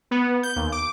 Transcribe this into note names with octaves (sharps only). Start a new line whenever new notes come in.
B3
G6
D#2
D6